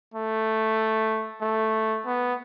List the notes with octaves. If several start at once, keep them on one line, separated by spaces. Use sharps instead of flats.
A3
A3
B3